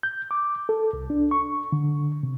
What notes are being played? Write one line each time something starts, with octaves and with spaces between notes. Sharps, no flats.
G6
D6
A4
C2
D4
C#6
D3
C3